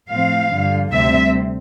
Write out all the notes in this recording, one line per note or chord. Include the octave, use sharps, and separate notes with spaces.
A2 F3 C4 F5
G2 D3 F3
D2 C3 G3 C4 E5